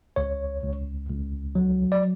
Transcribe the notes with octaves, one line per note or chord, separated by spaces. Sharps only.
C#2 C#5
C#2
C#2
F#3
D5